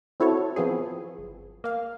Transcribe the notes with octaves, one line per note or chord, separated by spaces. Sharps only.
C4 E4 F#4 A4 C#5
F3 B3 C4 G#4
G1
A#3 F5